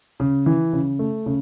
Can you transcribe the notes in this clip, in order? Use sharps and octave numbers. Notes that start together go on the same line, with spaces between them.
C#3
E3
C#3
A3
C#3